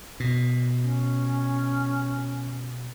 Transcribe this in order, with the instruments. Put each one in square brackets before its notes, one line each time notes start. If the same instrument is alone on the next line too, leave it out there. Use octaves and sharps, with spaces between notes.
[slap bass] B2
[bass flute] C#4